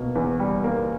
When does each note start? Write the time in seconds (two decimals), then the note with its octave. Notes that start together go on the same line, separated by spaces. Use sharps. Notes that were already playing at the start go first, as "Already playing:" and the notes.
Already playing: B2 A#3
0.15 E2
0.39 G3
0.64 A#3